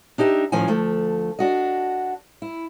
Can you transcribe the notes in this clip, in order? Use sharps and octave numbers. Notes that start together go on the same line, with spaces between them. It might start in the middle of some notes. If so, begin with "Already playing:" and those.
D4 D#4 G4 D#5 E5
D2 A2 D#3 F3 C#4 G#5
D2 F3 A3
D4 F#4 D#5
E4